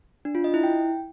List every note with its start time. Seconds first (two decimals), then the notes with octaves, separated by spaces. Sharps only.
0.25 D4
0.35 F4
0.44 D#5
0.54 E4
0.63 G5